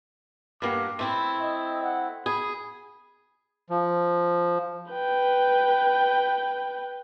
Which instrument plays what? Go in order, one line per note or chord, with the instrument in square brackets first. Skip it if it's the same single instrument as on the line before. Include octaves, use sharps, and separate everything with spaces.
[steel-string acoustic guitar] G2 A#3 F#5 [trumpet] D6
[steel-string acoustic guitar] A3 C4 E4 [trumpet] C6
[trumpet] D#5
F#5
[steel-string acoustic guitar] G#4 [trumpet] B5
[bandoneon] F3
[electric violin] B4 G5